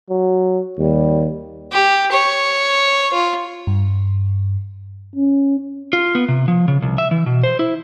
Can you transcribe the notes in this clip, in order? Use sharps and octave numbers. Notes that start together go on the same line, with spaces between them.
F#3
D#2 G3
G4
C#5
F4
G2
C#4
F4
B3
C3
F3
C#3
C2
E5
E3
B2
C5
E4